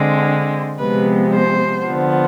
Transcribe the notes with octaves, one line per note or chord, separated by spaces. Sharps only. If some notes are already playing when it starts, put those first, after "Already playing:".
Already playing: D3 G#3 C4
C3 F3 G#3 B3 B4
C5
D3 F3 B3